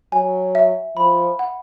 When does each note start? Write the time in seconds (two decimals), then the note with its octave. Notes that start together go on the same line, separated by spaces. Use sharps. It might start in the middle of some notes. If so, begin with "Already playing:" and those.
0.12 F#3 G#5
0.55 E5
0.97 F3 B5
1.39 F#5